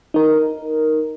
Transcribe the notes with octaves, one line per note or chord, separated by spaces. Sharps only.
D#4 A#4